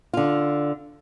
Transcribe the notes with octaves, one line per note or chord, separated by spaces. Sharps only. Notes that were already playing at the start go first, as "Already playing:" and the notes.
D3 F4